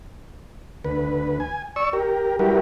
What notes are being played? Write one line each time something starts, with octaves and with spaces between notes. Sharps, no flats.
D2 B4
G#5
D5 C#6 E6
G4 A#4
G3 E4 F#4 G4 A#4 B4